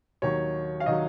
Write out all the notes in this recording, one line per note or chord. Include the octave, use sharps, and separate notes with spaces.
D#2 D#3 F#3 C#5
F5
D#3 F#3 D#5